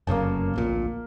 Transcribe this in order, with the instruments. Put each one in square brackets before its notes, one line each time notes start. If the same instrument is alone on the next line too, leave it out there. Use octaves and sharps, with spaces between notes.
[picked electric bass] F1 F#2 C#3 [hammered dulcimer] A#3 A5
[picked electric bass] D1 A#1 A#2